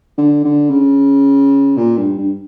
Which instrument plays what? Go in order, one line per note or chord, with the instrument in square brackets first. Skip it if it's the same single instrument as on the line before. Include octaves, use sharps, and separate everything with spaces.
[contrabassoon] D3
D3
C#3
A#2
G2
G2